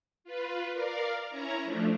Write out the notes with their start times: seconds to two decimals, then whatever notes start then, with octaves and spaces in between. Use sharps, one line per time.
0.24 F4 B4
0.72 A#4 D5 F5
1.29 C#4 E4 C#5 A#5
1.64 F3 A3 D4